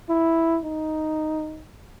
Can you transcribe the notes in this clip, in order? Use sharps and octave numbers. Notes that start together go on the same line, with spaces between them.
E4
D#4